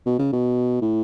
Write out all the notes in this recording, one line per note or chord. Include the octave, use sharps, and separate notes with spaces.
B2
C#3
B2
A2